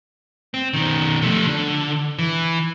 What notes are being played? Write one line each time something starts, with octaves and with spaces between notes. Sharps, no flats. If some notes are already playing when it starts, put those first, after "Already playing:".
C4
B2 D#3
F3 A3
D3
E3